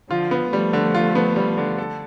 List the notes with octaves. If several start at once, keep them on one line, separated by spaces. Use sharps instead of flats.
D3 F3 F4
B3
F3 G3 A3
D3
F4
B3
G3
D3
A4